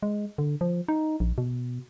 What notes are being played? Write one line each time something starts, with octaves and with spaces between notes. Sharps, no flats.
G#3
D3
F3
D#4
A#1
B2